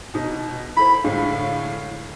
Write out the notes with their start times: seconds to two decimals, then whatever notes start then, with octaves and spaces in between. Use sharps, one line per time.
0.14 B2 D#4
0.77 E4 A4 C5 B5
1.04 A2 D3 G#3 F5